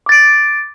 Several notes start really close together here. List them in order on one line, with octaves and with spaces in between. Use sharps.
D6 A6 D7